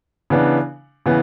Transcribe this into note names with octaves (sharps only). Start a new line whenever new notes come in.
C#3 E3 B3 D4
C#3 E3 B3